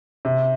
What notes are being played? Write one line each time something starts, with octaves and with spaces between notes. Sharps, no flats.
C3